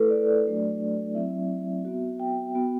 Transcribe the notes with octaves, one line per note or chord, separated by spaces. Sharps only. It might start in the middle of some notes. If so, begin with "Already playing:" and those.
Already playing: A3 E4 A4 B4
D5
D5
F#3 A3 D4 F#4
F#3 C4 E4 E5
B3 F#4
G5
B3 F#4